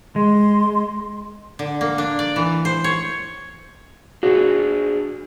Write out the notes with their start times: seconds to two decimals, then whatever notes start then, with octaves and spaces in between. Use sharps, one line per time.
0.16 G#3 C6
1.59 D3
1.81 A#3
1.98 D4
2.19 D5
2.36 E3
2.65 C5
2.84 C#5
4.23 D4 F#4 G#4 C5